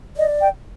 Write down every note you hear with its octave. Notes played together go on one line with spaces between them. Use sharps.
D5 D#5
G5